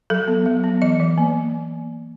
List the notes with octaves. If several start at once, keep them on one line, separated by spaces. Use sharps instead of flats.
F#3 A4
B3
F#3
B3
E3 D#5
E3
A#3